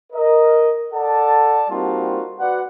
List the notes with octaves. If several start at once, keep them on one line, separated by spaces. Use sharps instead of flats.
A#4 D#5
A4 D5 F#5 A5
G3 A#3 C4 D#4 F4 F#4
F#4 B4 D5 F#5